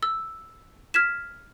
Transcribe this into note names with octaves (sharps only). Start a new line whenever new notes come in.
E6
F6 G#6 B6 E7